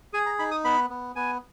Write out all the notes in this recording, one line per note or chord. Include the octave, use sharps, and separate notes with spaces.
G#4 G#5
A#5
D#4 B5
D#6
B3 B5
B3
B3 G#5